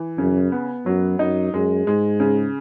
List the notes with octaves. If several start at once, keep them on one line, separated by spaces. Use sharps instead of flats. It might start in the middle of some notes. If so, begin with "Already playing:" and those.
Already playing: E3
F#2 C#3
B3
F#2 F#3
F#2 D#4
F#2 G#3
G#2 G#3
C#3